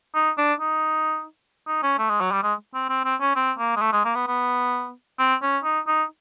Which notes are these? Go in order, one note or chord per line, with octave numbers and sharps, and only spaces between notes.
D#4
D4
D#4
D#4
C#4
A3
G#3
F#3
G3
G#3
C4
C4
C4
C#4
C4
A#3
G#3
A3
G#3
A#3
B3
B3
C4
C#4
D#4
D#4